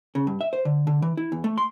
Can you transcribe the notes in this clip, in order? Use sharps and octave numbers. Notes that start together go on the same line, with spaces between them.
C#3
G2
E5
C5
D3
D3
E3
E4
E2
A3
C6